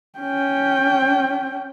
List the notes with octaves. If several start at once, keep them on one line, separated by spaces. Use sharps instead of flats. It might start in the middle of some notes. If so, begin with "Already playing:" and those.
C#4 G5